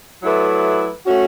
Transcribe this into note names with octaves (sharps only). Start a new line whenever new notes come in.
F#3 A3 E4 B4 D5
A3 C#4 F#4